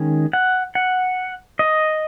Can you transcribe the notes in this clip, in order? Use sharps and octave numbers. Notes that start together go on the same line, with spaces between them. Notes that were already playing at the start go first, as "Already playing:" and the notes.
Already playing: D#3 G#3 C#4
F#5
F#5
D#5